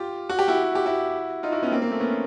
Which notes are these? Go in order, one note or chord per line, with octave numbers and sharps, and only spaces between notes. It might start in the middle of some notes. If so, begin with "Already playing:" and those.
Already playing: F4 G4
F#4
G4
E4 F#4
G4
E4 F#4
D#4 F4
E4 F#4
B3 C#4
A#3 C4
A#3
A3
B3 C#4